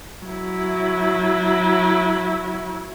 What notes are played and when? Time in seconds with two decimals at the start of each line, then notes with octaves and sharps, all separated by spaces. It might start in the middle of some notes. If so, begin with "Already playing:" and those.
0.26 F#3 E4